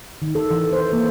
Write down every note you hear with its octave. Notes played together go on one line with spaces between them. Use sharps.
D#3
A4
E3
C5
A#3